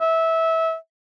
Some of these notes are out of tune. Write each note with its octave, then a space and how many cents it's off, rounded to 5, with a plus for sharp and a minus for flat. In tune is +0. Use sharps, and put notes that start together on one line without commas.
E5 -20